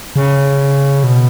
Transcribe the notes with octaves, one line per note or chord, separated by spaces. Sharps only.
C#3
B2